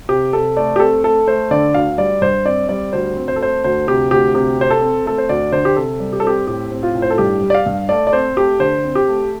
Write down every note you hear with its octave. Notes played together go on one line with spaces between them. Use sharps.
C3 G4
C3 A4
A3 D5
G4
C4 A4
A3 A4
A3 C5
D3 D5
D2 F5
G3 D5
G2 C5
C4 D5
G3 D5
D2 C5
C4
C5
A4
A3 C5
D2 C5
C3 G4
D2 G4
C3 G4
C4 C5
A4
C4
A3 A4
C5
D2 D5
D3 C5
G4
C3 A4
G3
G4
A4
C4 G4
A2 G4
C4
F4
A2
C5
A4
G2 G4
G3
D5
F5
G2
A3 D5
D5
C4 C5
A3 G4
D3 C5
C4
G4
A3